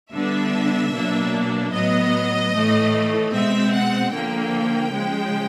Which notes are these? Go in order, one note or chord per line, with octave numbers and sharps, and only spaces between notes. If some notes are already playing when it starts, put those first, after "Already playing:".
D3 G3 B3 D4 E5
B2 F#3 A#3 D4
A2 F#3 B3 D#5
A2 E3 A3
B2 G#3 C4 E5
F#5
D3 F3 A#3 G5
C#3 F3 G#3